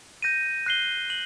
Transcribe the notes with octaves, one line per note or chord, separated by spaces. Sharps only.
G6 A#6 D#7
F#6 C7 G7
F#7